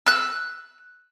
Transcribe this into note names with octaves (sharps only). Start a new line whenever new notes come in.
E6 F#6